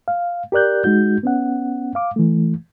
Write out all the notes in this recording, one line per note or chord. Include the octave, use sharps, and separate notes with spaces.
F5
G4 A#4 D5 F#6 G6
G#3 D#4 F#4 G6
B3 C#4 F#5
F5 D6
E3 A3